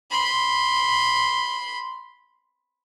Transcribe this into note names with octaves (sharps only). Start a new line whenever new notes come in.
B5 C6